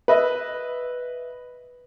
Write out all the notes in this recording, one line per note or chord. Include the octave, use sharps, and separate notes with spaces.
B4 D#5 E5